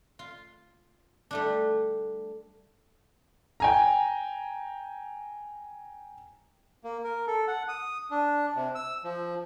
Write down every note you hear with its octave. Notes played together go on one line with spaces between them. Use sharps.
F4
G3 A3 D4
G5 G#5 A#5
A#3
A#4
A4
F#5
D#6
D4
C3
E6
F3